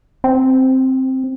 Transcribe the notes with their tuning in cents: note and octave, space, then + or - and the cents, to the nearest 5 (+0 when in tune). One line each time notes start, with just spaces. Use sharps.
C4 +5